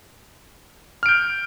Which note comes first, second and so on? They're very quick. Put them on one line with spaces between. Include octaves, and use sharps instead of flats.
F6 D7 G6